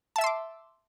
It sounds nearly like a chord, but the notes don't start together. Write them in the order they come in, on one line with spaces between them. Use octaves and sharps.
A5 E5 E6 C6 D6